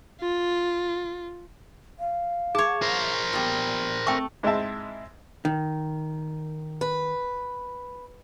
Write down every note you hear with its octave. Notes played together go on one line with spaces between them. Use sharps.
F4
F5
G#4 C#5 A5
A#4 C5
A#2 G3 B3
A3 C4 G5 C#6
G#2 G#3 C4 E4 E5 A5
D#3
B4